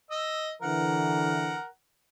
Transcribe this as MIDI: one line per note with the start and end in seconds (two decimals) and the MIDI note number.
0.11 0.51 75
0.11 0.51 88
0.62 1.56 50
0.62 1.56 52
0.62 1.66 70
0.62 1.66 78